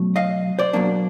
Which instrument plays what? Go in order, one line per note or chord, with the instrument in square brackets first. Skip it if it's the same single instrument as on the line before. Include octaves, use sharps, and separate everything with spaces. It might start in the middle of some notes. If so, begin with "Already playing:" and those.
Already playing: [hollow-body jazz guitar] B2 F#3 A3
D#5 F5
C5 D5
B2 F#3 A#3 D4